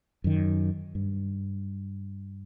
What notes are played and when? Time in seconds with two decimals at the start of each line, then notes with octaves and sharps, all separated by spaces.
0.24 F#2 D#3
0.95 G2